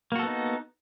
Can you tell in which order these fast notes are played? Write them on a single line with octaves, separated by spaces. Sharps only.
A#3 F#4 A4 B3 D#4